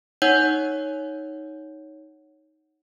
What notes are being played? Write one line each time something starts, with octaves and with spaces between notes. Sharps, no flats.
D#4 C#5 F#5 G6